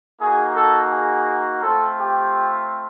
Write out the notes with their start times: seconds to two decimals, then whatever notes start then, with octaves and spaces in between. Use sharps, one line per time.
0.20 A#3 D#4 F#4 G#4
0.55 A4
0.91 G#4
1.62 A3 C4 F4 A4
1.98 G4